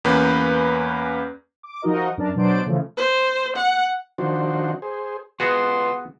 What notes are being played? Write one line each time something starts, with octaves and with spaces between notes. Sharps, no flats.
E2 A#3 C#4 B4 G6
D6
F3 D#4 F#4 A#4 D#5
F#2 D4 A#4 D5 A5
B2 F#3 D4 C5 D5 D7
C#3 E3 F3 A3
C5
F#5
D#3 F3 D4 F#4 C5
G#4 C5
B3 F4 F#4 G#4 B4 F#5 C6 D#6